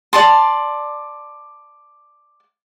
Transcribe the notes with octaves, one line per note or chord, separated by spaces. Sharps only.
D5 A5 C6